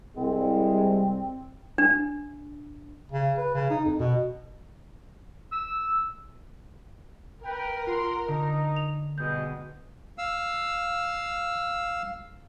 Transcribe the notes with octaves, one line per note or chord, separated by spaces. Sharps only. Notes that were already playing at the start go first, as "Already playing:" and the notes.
C2 G#3 C4
D4
C#3
B4
C#3
D#4
F2
B2
E6
A#4 B4 G5
F4 F#5 C6 C7
D3 D#4 A#5
F7
B2 G3 G#3 D#5 G6
F5 E6